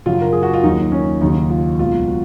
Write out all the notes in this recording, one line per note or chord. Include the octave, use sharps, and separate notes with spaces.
F#2 C#3 F#3 F4
A#4
G#4
F#4
F4
D#2 D#3 F#3 D#4
C#4
D#2 C#3 F#3 D#4
F4
C#2 B2 F#3 F4
F#4